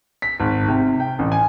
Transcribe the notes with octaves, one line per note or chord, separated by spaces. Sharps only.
B6
G#1
C3
G5
A1
G#5